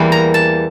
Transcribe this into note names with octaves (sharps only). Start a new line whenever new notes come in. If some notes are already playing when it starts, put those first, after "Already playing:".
Already playing: E2 E3 G3 A#3
A#5
A5